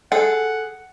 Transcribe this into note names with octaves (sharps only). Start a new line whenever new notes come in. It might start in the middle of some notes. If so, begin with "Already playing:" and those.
G#4 A4 F#5